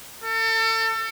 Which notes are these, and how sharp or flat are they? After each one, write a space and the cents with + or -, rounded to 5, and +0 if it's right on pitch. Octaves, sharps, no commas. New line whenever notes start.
A4 +35